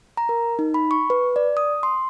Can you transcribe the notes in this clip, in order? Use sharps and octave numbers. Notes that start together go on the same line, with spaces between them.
A#5
A#4
D#4
B5
C#6
B4
D5
D#6
C6